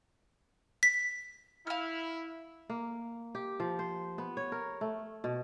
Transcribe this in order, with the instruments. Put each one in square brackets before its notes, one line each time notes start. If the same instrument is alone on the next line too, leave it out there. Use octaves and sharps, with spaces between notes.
[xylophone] B6
[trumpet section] E4 [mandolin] F5 F6
[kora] A#3
G4
F3
C5
B3
C#5
A#4
A3
B2